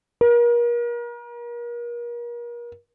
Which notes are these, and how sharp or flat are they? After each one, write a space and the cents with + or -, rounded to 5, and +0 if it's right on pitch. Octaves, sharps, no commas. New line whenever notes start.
A#4 +35